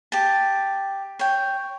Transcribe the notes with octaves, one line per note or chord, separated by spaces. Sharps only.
G4 A5
C#5 G5